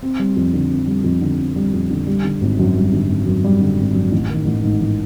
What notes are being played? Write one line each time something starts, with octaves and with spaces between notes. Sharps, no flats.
C4
G3
F2
D3
C4
G3
F2
D3
C4
G3
F2
D3
G3
D3
G#1
F#2
G3
D3
G#1
F#2
G3
D3
G#1
F#2
A1
D#3
A1
G#2
A1